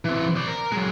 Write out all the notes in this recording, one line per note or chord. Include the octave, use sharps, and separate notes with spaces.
E3 C4
C5 D5
A#4
F#3 G#3